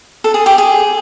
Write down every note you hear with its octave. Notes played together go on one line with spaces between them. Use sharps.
A4
G#4
G4
G#4